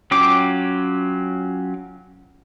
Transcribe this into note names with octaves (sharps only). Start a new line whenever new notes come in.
F#3 C#4 F4 G5 D6